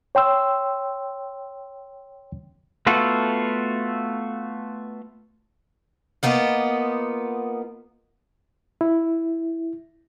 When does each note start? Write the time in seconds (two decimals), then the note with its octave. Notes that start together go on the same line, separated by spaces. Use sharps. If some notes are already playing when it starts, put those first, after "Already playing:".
0.15 C#5 G5 C6 E6
2.87 A3 B3 F4 F#4 A4
6.23 A#3 B3 D#4 F4
8.81 E4